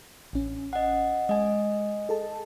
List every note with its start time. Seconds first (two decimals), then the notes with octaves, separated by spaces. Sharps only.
0.33 A1 C#4
0.73 D#5 F#5
1.29 G#3 D#5 G#5
2.09 G#4 A4 A5